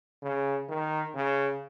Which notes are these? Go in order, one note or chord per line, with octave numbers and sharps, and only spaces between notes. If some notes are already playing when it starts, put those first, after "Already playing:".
C#3
D#3
C#3